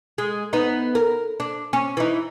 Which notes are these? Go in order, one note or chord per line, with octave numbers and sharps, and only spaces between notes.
G#3
B3 D#4
A#4
D4
C#4
E3 D#4